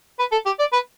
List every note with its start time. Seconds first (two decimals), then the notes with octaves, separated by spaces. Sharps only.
0.19 B4
0.32 A4
0.46 G4
0.59 D5
0.73 B4